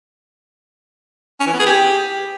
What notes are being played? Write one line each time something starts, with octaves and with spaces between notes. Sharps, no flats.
C#4
E3
B3
G#4
G4